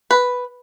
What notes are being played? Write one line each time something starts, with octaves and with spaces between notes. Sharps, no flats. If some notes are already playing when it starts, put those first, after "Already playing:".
B4